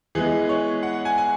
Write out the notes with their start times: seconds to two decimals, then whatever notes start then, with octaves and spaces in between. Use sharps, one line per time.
0.15 E3 G#3 B3 G#4
0.49 C#5
0.83 F#5
1.05 G#5
1.18 G#5